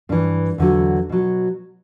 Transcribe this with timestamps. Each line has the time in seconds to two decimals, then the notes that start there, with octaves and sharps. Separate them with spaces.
0.09 G2 E3 D4
0.58 E2 D3 F#3
1.09 B2 F#3